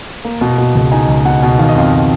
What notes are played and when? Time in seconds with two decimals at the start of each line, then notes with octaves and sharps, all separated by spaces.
0.25 A#3
0.41 B2
0.58 B2
0.75 C#2
0.91 D#4 G#5
1.08 C#2
1.25 B2 F#5
1.43 B2
1.59 D#3 F5
1.69 D#5
1.75 F2 F5